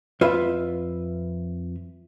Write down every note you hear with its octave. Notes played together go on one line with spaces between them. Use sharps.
F2 F4 B4 E5